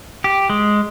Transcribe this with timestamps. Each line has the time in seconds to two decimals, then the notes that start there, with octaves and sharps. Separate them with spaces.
0.24 G4
0.50 G#3